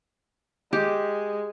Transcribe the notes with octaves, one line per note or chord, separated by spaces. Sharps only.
G#3 G4